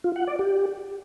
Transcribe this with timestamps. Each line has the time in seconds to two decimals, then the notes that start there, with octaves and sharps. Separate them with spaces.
0.04 F4
0.16 F#5
0.27 D5
0.39 G4